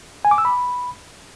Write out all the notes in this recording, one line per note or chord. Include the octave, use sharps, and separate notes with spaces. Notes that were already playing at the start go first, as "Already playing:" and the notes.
G#5
D6
E6
B5